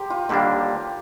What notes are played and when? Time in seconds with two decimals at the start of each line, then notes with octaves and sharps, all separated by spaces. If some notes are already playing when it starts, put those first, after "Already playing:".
Already playing: G4 A#4 C5
0.10 F4
0.29 D#2 D3 G3 A#3 D4 G4